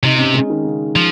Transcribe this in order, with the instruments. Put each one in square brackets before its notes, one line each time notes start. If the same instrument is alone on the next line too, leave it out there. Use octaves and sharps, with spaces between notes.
[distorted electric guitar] C3 [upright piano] D#4
[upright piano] D#4
C#4
G#3
D#3
C#3
[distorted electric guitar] F3